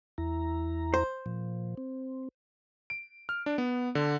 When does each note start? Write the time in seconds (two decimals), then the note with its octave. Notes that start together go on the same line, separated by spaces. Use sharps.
0.18 E2 E4 A#5
0.94 C5
1.26 A#2 F3
1.77 C4
2.90 D7
3.29 F6
3.46 D4
3.58 B3
3.95 D3